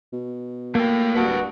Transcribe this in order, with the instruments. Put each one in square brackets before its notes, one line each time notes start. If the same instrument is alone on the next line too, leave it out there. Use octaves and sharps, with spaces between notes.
[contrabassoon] B2
[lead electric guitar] A3 G5 [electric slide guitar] A#3
[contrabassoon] D1 [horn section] G2 G3 F#4 [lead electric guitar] B4 A5